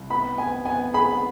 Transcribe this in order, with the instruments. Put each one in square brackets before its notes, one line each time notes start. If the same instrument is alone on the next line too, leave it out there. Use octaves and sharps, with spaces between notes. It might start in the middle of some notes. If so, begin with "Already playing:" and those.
Already playing: [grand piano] C2
[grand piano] B3 [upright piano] B5
[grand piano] B3 [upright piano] G#5
[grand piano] B3 [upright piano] G#5
[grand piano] G#4 [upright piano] B5